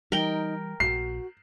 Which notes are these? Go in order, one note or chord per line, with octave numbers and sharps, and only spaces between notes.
E3 G3 D#4 A#4 G5
A#1 F#4 C7